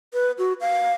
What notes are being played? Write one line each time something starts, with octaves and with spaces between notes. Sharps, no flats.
B4
F#4
F5